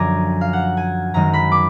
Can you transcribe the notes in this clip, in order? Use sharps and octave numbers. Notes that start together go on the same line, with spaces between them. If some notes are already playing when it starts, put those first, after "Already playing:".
Already playing: F#2 D3 F3 G#3 G#5 A#5 D6
F5
F#5
G#5
F#2 D#3 G#3 A#5
B5
D6